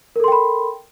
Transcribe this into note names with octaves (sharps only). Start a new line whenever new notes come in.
A4 A#4 G5 B5 C6